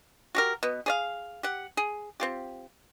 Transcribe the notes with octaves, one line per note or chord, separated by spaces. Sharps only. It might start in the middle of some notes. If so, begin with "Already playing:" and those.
F#4 G4 A#4
B2 B3
G#4 D5 F5
G4 F#5
G#4
C4 F4 G4